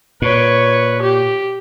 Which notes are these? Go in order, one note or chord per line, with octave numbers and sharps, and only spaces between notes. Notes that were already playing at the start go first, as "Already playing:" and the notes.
A#2 B4 C#5
G4